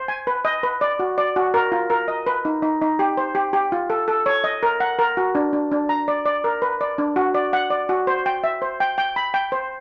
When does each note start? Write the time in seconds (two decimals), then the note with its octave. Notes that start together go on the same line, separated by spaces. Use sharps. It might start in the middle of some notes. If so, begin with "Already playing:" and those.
Already playing: C5
0.08 G#5
0.27 B4
0.45 D#5
0.63 B4
0.81 D5
0.99 F#4
1.18 D5
1.36 F#4
1.54 A#4
1.72 F4
1.90 A#4
2.08 D#5
2.27 B4
2.45 D#4
2.62 D#4
2.82 D#4
2.99 G4
3.17 C5
3.35 G4
3.53 G4
3.72 F4
3.90 A4
4.08 A4
4.26 C#5
4.44 D#5
4.63 A#4
4.80 F#5
4.99 A#4
5.17 F#4
5.35 D4
5.53 D4
5.72 D4
5.89 A#5
6.08 D5
6.26 D5
6.44 A#4
6.62 B4
6.81 D5
6.98 D4
7.16 F#4
7.35 D5
7.53 F#5
7.70 D5
7.89 F#4
8.07 C5
8.26 G5
8.44 E5
8.62 C5
8.80 G5
8.98 G5
9.16 B5
9.34 G5
9.52 C5